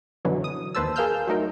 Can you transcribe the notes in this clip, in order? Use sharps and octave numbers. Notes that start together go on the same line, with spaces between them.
F#2 B2 D3 E3 F#3
D#6
D#2 A#3 B4 C5 A5 E6
G#4 A#4 F5 E6 F6 G6
F#3 A3 D#4 A#4